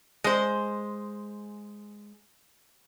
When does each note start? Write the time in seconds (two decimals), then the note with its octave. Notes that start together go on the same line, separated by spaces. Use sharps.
0.24 G#3 C5